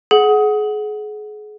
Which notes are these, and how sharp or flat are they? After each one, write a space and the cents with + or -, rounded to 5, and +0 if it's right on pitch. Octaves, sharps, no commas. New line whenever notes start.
G#4 +30 F#5 +0